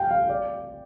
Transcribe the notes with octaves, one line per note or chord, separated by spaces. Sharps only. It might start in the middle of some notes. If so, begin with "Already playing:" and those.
Already playing: F5 G5
F5
D5